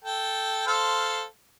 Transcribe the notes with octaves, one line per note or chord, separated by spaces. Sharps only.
A4 G5
A4 C5 F5